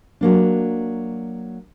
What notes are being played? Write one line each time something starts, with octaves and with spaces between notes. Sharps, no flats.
F#3 A#3 D4